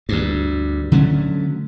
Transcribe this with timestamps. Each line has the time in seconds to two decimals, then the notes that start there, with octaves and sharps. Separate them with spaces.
0.09 D2 G2
0.92 D3 F#3 A3 C#4